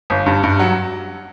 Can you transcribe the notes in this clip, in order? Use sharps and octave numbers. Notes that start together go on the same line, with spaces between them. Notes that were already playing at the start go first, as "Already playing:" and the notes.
G1
G2
G2
F#3